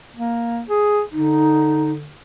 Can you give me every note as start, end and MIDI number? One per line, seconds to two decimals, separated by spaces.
0.16 0.62 58
0.69 1.02 68
1.12 2.12 50
1.12 1.90 63